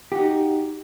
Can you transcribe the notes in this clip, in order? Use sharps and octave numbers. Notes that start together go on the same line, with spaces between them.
D#4 F#4 G4